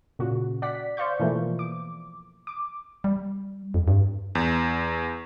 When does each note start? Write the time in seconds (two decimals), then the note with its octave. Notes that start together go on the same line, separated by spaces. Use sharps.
0.19 A#2 C#3 F#4
0.62 D5 F#5 B6
0.97 C5 D5 F5 C#6 G6
1.20 B2 E3 F3 A3 A#3
1.59 D6
2.47 D6
3.04 G3
3.74 F2
3.88 G2
4.35 E2